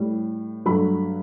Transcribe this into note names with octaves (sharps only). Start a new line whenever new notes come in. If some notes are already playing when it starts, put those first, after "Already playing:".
Already playing: A2 G3
G2 F#3 A3 B5